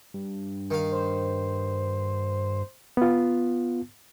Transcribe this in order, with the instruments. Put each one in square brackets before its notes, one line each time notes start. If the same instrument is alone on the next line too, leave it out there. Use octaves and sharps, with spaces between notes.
[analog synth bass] G2
[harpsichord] D#3 F5
[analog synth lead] C5
[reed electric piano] B3 F4